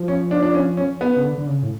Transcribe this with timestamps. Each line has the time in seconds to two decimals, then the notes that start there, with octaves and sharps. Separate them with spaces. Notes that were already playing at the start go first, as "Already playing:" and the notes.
Already playing: F3
0.08 C#4
0.31 D4
0.43 D4
0.54 C#4
0.77 C#4
1.01 B3
1.17 C#3
1.24 D3
1.38 D3
1.47 C#3
1.63 A2